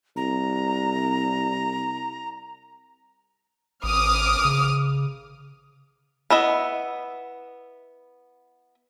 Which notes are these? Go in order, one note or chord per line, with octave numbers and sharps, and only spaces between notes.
C2 A#5
A1 D6 D#6 F6
C#3
B3 E4 D#5 E5